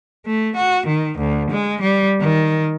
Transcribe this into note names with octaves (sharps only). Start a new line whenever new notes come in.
A3
F#4
D#3
D2
G#3
G3
D#3